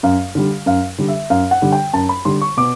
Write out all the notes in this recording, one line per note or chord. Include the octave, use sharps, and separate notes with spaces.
F#2 F5
D3 G3
F#2 F5
D3 G3
E5
F#2 F5
F#5
D3 G3
G5
F#2 A5
B5
D3 G3 C6
C#6
B2 D6